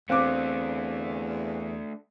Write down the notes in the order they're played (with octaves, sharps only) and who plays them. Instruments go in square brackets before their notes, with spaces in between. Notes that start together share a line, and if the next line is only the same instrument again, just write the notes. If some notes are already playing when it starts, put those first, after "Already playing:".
[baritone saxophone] E2 [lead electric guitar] A3 D4 [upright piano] C4 D6 [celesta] F5 F#6